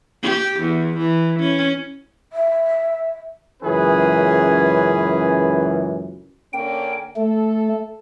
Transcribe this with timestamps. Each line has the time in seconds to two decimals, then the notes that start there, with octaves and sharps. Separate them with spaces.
0.22 G4
0.60 E2
0.98 E3
1.40 C#4
2.33 E5
3.63 C#2 F#2 E3 C#4 G#4 B4
6.53 D3 A#3 C#4 G5
7.16 A3 A4